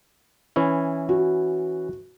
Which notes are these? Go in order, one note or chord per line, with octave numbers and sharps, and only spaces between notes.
E3 C#4 E4
F#4